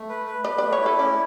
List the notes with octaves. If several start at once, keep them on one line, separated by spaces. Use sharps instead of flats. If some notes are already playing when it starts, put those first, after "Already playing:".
Already playing: A3
B4
B4
B4 D5
A3 D5
C#5
E4
A4
C#4 D5